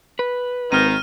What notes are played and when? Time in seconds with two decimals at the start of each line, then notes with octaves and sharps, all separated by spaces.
0.19 B4
0.72 G#1 D#3 D#4 F6 D#7